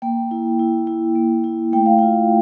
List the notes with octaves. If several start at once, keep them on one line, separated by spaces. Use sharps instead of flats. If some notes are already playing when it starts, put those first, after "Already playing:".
A#3 G5
E4
E4
E4
A#3
E4
A3 G5
F5
F4 G5